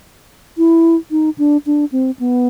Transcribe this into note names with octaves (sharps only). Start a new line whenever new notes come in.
E4
D#4
D4
D4
C4
B3